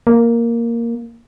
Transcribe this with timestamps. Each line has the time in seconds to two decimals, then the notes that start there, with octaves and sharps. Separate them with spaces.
0.07 A#3